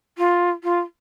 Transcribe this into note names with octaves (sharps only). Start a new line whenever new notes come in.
F4
F4